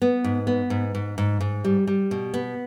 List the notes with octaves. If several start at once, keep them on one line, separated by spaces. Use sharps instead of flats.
B3
G#2
B3
G#2
G#2
G#2
G#2
G3
G3
B2
B3